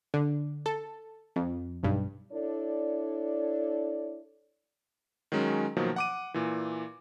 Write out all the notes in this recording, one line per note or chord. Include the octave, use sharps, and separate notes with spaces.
D3
A4
F2
B1 G2
D4 E4 A4 C#5 D5
D#3 F#3 G#3 C#4
B2 D#3 F3 F#3 A#3
F#5 D6 D#7
A#2 E3